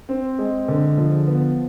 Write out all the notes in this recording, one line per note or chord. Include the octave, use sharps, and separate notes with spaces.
C4
G#3
D3
F3
B3